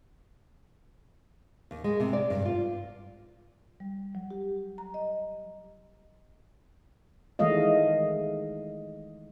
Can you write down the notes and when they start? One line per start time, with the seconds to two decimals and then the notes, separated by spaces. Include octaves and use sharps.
1.71 D#2
1.84 G#3
2.00 C3
2.13 D5
2.30 G2
2.45 F4
3.80 G3
4.15 F#3
4.31 G4
4.78 A#5
4.94 D#5
7.39 D#3 E3 G#3 A3 D#5 F5